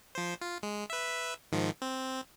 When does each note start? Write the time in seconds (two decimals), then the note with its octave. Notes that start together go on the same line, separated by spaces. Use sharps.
0.15 F3 C5
0.42 F4
0.63 G#3
0.90 B4 E5
1.52 G#2 D#3 F3
1.82 C4